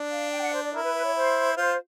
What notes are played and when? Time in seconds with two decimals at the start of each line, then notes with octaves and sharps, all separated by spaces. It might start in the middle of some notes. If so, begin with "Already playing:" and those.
Already playing: D4
0.10 F5
0.31 G5
0.42 F#5
0.53 C5
0.63 D5
0.73 E4 A#4
0.83 B4
0.95 B4
1.04 C#5
1.15 C5
1.57 F4 C5